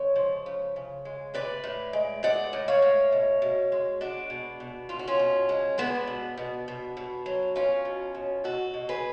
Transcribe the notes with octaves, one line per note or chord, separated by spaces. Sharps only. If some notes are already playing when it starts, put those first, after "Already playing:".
Already playing: C#3 G#3 C#5
F3
C#3
C#3
G#3
A2 B4 D5
A2
G#3
G#3 D5 F#5
A2
C#5 F5
A2
B2
B2
G#3
G#3 D4 F#4
B2
B2
B2 F4
F#4
C#4 F4
B2
G#3
G#3 B3 D4
B2
B2
B2
B2
F#3
F#3 C#4 F4
B2
B2
B2 F#4 A4
B2
G#4 B4